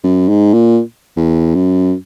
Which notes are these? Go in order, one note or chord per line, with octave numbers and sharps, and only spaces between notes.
F#2
G#2
A#2
E2
F#2